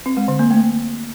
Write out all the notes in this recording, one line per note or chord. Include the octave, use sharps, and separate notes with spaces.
C4
G#3
D3
A#3
A3